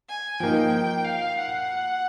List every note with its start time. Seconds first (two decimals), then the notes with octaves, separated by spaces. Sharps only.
0.09 G#5
0.40 F3 A#3 D#4 G5
1.05 F5
1.38 F#5